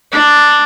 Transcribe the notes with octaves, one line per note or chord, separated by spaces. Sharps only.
D4